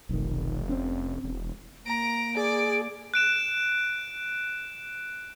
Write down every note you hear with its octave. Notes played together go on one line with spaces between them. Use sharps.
F1 B1 D#3
C4 C#4
E1
A#3 A#5 D7
G#4 D5
F#6 D7 E7